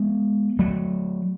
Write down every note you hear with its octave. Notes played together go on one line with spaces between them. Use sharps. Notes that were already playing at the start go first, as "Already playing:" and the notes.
Already playing: G#3 B3
F#3 A3